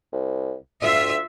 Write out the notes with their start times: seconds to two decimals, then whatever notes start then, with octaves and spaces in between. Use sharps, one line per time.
0.13 C2
0.82 D2 F4 E5